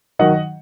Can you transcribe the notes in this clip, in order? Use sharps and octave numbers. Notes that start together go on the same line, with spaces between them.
D#3 F#3 D#5 F#5